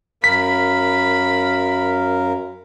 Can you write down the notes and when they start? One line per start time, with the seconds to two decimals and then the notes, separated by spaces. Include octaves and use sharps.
0.24 F#2 A#4 F5 B5 B6